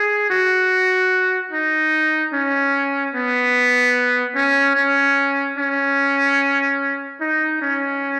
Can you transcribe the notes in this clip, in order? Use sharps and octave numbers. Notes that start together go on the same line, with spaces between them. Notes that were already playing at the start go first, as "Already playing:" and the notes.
Already playing: G#4
F#4
D#4
C#4
B3
C#4
C#4
C#4
D#4
C#4